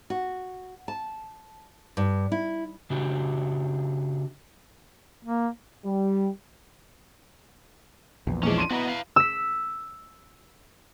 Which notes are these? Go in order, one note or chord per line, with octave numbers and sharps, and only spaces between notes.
F#4
A5
G2
E4
C#3 D4 F#4 G4
A#3
G3
A#1 E2
E3 F3 G#3 C#4 D4
C6 D7 D#7
B3 E4 F#4 B4 D#5 A#5
B4 F5
E6 B6